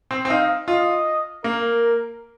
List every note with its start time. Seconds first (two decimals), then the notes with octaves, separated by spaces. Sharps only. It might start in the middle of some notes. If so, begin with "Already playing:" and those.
0.11 C4
0.25 C4
0.30 D#4 F5
0.68 F4 D#5
1.44 A#3 A#4